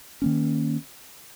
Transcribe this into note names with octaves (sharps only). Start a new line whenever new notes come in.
D#3 A#3 C#4